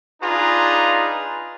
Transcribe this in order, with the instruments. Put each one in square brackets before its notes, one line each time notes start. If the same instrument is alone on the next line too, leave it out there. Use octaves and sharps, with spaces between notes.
[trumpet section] D4 D#4 F4 G#4 B4 A#5